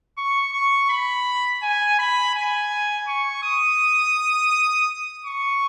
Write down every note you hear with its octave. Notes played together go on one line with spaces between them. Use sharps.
C#6
C#6
B5
G#5
B5
G#5
C#6
D#6
C#6